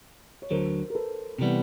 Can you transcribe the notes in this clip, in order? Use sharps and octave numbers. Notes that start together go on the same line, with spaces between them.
C#5
D2 D3 F#3 A#4 C5
A#4
A4 B4
C3 E3 G3 B3